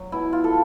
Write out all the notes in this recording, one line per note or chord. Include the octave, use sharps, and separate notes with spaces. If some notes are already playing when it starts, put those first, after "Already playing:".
Already playing: F#3
B2 E4
F4
A4